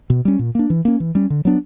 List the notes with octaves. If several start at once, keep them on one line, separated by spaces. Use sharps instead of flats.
B2
G3 C#4
A#2
A#3 D4
E3
A#3 C#4
E3
G3 C#4
D3
F#3 B3 D4